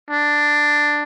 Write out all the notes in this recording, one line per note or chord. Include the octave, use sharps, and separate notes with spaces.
D4